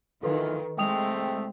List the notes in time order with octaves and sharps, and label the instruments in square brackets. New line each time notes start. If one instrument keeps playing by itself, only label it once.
[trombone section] D2 E3 F4 [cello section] D#3 [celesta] A4 B4
[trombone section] C2 A3 C4 [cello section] G#3 [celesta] G5 D#6 F7